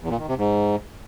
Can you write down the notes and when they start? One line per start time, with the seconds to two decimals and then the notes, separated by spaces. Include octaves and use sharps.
0.01 E2
0.10 A#2
0.19 D#3
0.28 C3
0.38 G#2